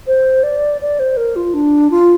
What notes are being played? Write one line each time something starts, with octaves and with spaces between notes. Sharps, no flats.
C5
D5
D5
C5
A#4
F4
D4
F4